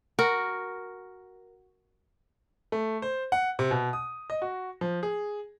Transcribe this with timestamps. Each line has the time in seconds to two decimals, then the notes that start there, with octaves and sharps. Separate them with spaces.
0.19 F#4 A#4
2.72 A3
3.02 C5
3.32 F#5
3.59 C3
3.71 B2
3.93 D#6
4.30 D#5
4.42 F#4
4.81 F3
5.03 G#4